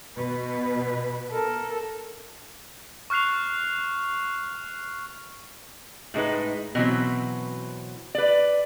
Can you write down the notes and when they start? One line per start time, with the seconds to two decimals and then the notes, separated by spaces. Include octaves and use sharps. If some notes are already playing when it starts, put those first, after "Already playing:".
0.17 B2 B4
1.31 A4 A#4
3.10 C#6 F6 F#6 C7 F7
6.14 A2 G#3 D#4 B4
6.75 B2 E3 F#3 C4
8.15 B4 D5